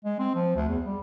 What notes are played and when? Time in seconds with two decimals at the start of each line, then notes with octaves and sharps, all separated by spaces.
0.05 G#3
0.19 C4
0.35 F3
0.55 D2
0.68 E2
0.85 G3